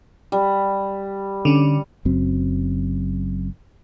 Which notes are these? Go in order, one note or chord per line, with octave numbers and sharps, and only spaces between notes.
G3
D3 C#4
F#1 F#2 F#3 C4